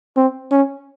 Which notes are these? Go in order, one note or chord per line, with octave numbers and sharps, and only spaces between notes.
C4
C#4